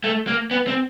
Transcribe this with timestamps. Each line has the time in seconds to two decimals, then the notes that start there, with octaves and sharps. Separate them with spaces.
0.04 A3
0.27 A#3
0.51 B3
0.67 C4